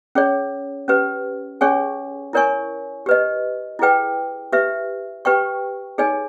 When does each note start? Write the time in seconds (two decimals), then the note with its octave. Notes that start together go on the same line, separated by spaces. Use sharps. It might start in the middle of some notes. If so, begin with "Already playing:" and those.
0.15 C#4 G#4 C#5
0.88 C#4 G4 B4
1.61 C#4 G#4 C#5 G#5 C#6
2.33 E4 A#4 C#5 G#5 C#6
3.06 G4 B4 D#5
3.79 E4 G#4 B4 G5
4.53 G4 B4 E5
5.25 G4 B4 G5 C#6
5.98 D#4 G#4 C#5 G#5